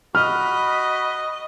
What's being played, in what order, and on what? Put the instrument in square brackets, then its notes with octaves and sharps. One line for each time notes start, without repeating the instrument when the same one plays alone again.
[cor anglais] F#4 [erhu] D#5 [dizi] B5 [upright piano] F6